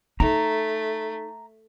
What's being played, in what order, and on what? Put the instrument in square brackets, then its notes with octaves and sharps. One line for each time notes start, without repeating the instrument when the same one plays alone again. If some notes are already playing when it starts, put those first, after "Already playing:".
[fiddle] A3 [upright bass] D#4 [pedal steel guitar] A#5